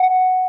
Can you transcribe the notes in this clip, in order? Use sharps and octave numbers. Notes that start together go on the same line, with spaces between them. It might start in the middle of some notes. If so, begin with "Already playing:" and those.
Already playing: F#5